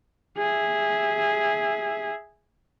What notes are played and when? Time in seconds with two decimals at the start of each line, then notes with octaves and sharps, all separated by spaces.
0.38 G#4 E5